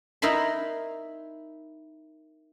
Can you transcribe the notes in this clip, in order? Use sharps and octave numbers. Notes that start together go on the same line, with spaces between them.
D#4 E4 A#4 B5 C6